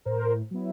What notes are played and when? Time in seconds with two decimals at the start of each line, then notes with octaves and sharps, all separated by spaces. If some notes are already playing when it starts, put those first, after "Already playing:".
0.05 A2 A#4 C5
0.51 F#3 B3 E4